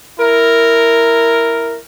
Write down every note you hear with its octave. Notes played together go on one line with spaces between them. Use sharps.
E4 A#4